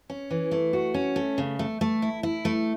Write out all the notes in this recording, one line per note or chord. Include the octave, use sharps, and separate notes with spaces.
C#4
E3
A3
F#4
C#4
A3
C#3
A3
A3
E4
E4
A3